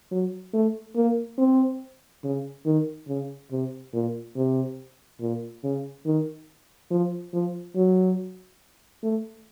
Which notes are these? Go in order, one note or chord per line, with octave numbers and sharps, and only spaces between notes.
F#3
A3
A#3
C4
C#3
D#3
C#3
C3
A#2
C3
A#2
C#3
D#3
F3
F3
F#3
A3